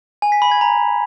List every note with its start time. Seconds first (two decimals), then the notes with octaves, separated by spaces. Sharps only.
0.22 G#5
0.32 B6
0.42 B5
0.51 G#6
0.61 A#5